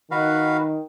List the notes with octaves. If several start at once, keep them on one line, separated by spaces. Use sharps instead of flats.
D#3 F#4 B4 F5